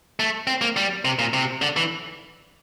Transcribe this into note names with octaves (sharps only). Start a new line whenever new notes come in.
A3
C4
A#3
G3
C3
A#2
C3
D3
E3